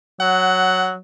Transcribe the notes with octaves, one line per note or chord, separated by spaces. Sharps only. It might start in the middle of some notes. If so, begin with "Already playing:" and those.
F#3 F#5